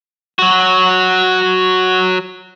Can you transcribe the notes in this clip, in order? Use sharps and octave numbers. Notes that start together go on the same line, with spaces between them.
F#3 F#4